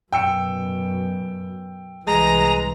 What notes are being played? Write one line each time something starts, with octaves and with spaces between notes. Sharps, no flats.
F#2 B2 G5 E6 C#7
C2 E3 G#3 A#5